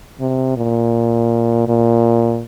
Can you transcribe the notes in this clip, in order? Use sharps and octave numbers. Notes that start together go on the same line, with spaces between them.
C3
A#2
A#2